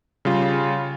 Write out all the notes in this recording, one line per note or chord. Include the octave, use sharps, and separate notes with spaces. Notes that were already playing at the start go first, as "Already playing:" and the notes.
C#3 G3 F4